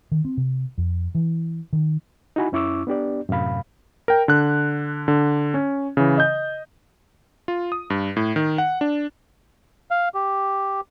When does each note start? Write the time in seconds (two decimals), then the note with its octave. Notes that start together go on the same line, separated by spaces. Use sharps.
0.12 D#3
0.25 C4
0.37 C3
0.78 F2
1.15 E3
1.73 D#3
2.36 D#4 E4 F#4 G#5 B5
2.52 F#2 C#4 E4 C#6 D6 E6
2.87 B3 D4 G4 D5
3.29 F#2 A2 C3 F5 B5
4.08 A#4 G5
4.28 D3 F#6
5.08 D3
5.54 C#4
5.97 C#3 E3
6.18 D#5 G6
7.48 F4
7.72 D#6
7.90 G2
8.16 A2
8.36 D#3
8.58 F#5
8.81 D4
9.91 F5
10.14 G4